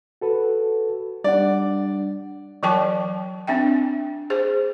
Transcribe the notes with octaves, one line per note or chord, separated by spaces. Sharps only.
F#4 A4 B4
G3 D4 D5 F#5
E3 F#3 A#4 G5 A5 C#6
C4 D4 E5 G5
G#4 C5